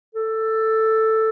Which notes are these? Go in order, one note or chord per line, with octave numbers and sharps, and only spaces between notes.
A4